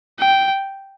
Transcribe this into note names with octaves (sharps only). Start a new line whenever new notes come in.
G5